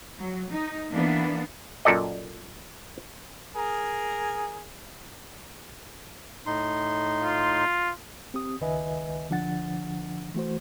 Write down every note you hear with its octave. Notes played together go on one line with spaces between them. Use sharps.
F#3
D#4
E3 A#3 B3 D4
F#2 A#2 A4 D5 D#5
G#4 A#4
A2 D#4 C6
F4
C4 G4 D#6
C#2 D#3 B4 D#5 E5 G#5
C2 D3 F3 D4 F#5 A6
E3 A3 F#4 C5